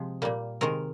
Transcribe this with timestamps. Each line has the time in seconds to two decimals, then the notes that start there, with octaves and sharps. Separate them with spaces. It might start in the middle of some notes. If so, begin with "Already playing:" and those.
Already playing: C3 F3 G#3
0.22 A#2 G3 A#3
0.61 C3 D#3 G#3 A#4